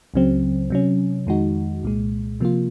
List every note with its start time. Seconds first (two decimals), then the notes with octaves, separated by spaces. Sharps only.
0.14 C#2 C#3 F#3 C4
0.70 C3 F#3 C#4
1.27 F2 D#3 G#3 D#4 F#4
1.83 C2 A#2 G#3
2.40 C3 F3 A#3 F4